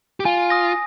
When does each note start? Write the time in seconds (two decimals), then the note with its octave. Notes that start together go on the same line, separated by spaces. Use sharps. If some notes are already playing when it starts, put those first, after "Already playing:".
0.20 G4
0.25 F4 G#5
0.50 D#6 A#6